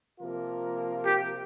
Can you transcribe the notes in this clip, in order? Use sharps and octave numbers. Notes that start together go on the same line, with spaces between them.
C3 F3 A#3 F4 A#4
G4